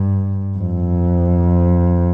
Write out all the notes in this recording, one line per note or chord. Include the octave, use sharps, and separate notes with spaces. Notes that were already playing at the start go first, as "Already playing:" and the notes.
Already playing: G2
F2